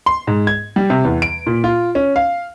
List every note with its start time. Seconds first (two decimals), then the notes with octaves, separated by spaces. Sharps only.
0.06 C6
0.27 G#2
0.47 G#6
0.76 G3
0.90 C3
1.05 E2
1.22 D7
1.46 A#2
1.64 F4
1.95 C#4
2.16 F5